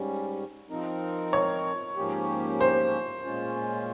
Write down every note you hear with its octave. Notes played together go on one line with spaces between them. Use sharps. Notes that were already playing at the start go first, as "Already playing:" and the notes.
Already playing: G#2 G3 C#4
F3 C4 D#4 A#4
C#5
G#2 F3 A#3 C#4 G4
C5
A#2 G#3 C#4 F4